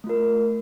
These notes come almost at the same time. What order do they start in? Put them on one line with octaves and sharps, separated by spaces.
A3 F4 A#4